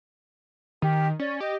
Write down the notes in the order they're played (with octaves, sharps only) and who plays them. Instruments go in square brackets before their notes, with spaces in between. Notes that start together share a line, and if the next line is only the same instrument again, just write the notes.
[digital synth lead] D#3 [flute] G4
[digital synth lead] C#4 [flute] D5
[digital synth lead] G4 [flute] D#5